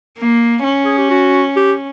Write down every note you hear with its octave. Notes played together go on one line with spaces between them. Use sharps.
A#3
C#4
G#4
G4
F#4
G4